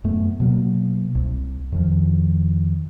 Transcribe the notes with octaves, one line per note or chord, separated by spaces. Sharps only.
F#2 A3 B3
B2 F#3 A#3
C2
F2 D#3 F3